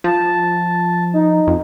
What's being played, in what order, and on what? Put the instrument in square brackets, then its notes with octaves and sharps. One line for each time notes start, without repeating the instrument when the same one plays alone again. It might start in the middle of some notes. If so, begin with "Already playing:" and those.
[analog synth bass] F3 [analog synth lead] A5
[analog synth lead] D#4
[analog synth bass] F2